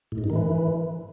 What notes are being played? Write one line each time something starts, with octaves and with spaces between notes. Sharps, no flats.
A2
G#2
G2
D#3
E3